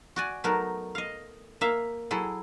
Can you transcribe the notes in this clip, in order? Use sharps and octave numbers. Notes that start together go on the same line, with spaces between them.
F#4 D5 G#5
F#3 A3 B3 D#4 A#4
D#5 F5
A#3 E5 F5
F#3 E4 G#4 A4